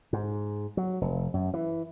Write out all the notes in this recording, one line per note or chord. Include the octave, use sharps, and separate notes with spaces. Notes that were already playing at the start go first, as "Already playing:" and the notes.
G#2
F#3
F1
F#2
E3